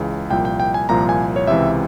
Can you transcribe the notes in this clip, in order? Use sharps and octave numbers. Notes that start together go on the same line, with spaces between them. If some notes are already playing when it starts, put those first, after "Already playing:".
Already playing: C#2 C#3 E3
C2 A#2 F3 G5
G5
G5
G#5
C2 A#2 F3 A#5
G#5
C#5
C#2 C3 E3 E5